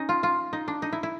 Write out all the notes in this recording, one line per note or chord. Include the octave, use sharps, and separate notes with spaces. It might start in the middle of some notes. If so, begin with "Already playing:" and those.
Already playing: C#4 D#4
F4
F4
D#4
D4
D#4
E4
E4